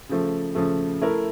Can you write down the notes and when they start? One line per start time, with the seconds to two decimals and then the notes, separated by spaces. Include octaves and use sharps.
0.09 C#3 F3 A3
0.55 C#3 F3 A3
1.01 A3 E4 A#4